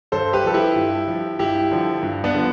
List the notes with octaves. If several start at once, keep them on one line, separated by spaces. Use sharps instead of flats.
G2 A4 C5
G4 B4
F3 A4
E4 G4
G2
F3
G2 E4 G4
D3 F3
G2
B3 D4
D3 F3